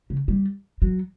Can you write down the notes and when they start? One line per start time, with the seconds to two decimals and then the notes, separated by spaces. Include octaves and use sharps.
0.10 C#3
0.28 G3
0.82 F#3